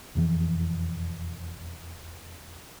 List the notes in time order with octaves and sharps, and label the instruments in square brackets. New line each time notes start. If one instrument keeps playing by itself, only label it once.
[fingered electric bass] E1 F2 E3 F3